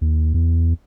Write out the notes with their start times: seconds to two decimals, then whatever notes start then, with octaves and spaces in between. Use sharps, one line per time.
0.01 D#2
0.34 E2